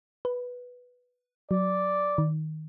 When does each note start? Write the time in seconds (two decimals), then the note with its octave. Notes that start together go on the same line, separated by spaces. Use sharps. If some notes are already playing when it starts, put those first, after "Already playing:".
0.25 B4
1.51 F#3 D5
2.18 D#3